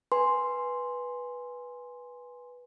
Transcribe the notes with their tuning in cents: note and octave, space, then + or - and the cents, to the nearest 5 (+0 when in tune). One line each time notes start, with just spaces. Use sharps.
B4 -10 G#5 +0 C6 +0